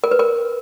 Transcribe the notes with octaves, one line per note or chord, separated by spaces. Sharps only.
A#4
B4
A#4